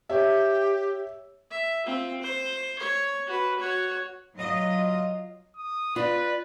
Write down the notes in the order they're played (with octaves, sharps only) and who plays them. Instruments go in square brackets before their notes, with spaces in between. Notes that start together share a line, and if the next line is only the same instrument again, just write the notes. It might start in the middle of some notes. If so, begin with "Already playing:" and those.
[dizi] G4 [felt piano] C#5 E5
[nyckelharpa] E5
C4 F4
C5
C#5
F#4 B4
F#4 C#5
[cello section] F#3 F4 D#5
[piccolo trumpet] D#6
[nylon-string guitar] F4 [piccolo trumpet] B4 [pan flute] D5